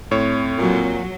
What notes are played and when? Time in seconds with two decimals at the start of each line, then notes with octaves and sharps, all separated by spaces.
0.11 A2 C4 C#5
0.58 A#2 F#3